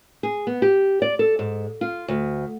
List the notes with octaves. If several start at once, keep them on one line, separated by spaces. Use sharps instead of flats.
G#4
B3
G4
D5
A4
G#2
F4
D2